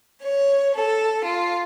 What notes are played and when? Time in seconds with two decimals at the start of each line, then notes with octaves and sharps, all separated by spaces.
0.22 C#5
0.74 A4
1.23 F4